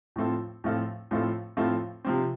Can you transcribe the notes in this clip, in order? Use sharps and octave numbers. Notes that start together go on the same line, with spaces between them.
A2 F3 C4 F4 A4
A2 F3 C4 F4 A4
A2 F3 C4 F4 A4
A2 F3 C4 F4 A4
C3 F3 C4